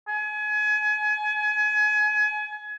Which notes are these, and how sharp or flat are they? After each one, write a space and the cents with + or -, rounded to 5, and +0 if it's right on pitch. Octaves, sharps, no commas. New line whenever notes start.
G#5 +30